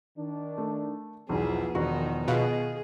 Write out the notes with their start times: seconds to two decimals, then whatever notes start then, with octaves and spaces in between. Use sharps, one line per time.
0.18 D#3 D4
0.58 A3
1.29 B1 E2 F3 B3 E4 F4 G#4
1.75 E1 D#3 D#4 F#4
2.28 B2 F4 G#4 D#5 F5